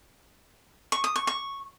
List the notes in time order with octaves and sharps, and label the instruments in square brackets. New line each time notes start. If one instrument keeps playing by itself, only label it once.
[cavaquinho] C#6
D#6
C#6
C#6